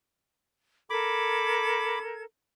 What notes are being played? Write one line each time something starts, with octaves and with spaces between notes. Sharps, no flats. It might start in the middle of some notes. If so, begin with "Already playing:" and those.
A4 A#4 B5 D6 G#6